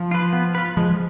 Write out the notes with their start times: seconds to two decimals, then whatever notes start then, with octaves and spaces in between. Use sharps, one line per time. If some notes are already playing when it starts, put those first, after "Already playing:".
Already playing: F3
0.11 F4 B4
0.33 B3
0.55 F4 B4
0.77 F3 G#3